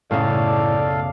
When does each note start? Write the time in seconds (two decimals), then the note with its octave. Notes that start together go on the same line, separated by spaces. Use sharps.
0.11 B1 F#2 A2 C#3 A4 D5 F5